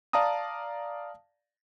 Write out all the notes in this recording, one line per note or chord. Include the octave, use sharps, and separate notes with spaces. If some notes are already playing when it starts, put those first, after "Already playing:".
D5 F5 A5 A#5 D#6